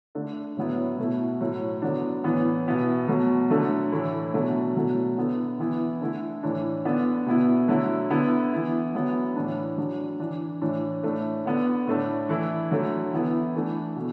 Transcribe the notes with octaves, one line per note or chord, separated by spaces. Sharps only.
D3 A3 D4
A2 F#3 B3 E4
B2 A3 E4
A2 F#3 A3
D3 F#3 B3 D4
A2 E3 B3
B2 B3 E4
B2 F#3 A3
D3 F#3 A3 D4
A2 E3 A3 E4
B2 F#3 A3 D4
B2 F#3 A3 E4
D3 B3 E4
E3 B3 E4
D3 A3 E4
A2 E3 D4
D3 B3 D4
B2 B3 E4
D3 F#3 A3 E4
D3 B3 E4
E3 B3 E4
D3 F#3 B3 E4
A2 E3 D4
D3 F#3 D4
E3 D4
A2 E3 D4
A2 A3 D4
D3 B3 D4
A2 A3 D4
E3 A3 E4
D3 F#3 A3
E3 B3 E4
E3 A3 D4
B2